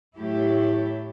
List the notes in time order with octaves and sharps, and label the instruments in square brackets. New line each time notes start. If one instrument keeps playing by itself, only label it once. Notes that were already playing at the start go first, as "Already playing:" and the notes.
[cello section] A2 F#3 A3 E4 G4